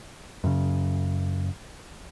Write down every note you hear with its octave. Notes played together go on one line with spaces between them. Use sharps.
F#2 C#3